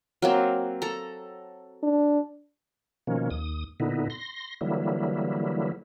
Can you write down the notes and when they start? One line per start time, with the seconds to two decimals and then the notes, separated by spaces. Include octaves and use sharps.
0.22 F#3 A#3 C4
0.82 A4 A#5
1.83 D4
3.07 B2 D#3 F3 A#3 C#4
3.30 D#2 D#6
3.80 A#2 D3 B3 D#4 E4
4.10 C6 A#6
4.61 D3 E3 F#3 G3 A#3 E4